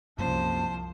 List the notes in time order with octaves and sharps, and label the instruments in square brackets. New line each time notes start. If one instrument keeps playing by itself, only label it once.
[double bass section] C2 F3 [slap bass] F#2 A#3 C#4 [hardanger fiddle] C5 [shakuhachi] A5